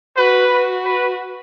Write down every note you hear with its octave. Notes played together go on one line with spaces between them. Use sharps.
F#4 B4
F#4
B4